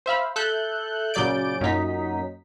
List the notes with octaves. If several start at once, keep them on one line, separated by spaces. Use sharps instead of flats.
C5 E5 F5 B5
A4 E5 F#6 G6
A#2 C#3 F#3 D5 G6 D7
F#2 A#2 D#4 B6